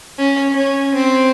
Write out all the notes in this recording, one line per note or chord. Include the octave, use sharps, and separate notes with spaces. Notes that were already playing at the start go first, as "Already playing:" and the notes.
C#4
C#4
C4